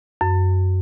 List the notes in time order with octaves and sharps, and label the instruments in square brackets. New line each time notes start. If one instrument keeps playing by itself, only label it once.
[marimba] F#2